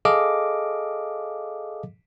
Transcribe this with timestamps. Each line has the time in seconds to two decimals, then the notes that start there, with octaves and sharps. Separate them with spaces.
0.05 G#4 A4 D#5 F5 D6